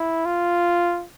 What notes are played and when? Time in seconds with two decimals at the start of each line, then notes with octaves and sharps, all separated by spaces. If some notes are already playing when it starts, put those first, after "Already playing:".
Already playing: E4
0.25 F4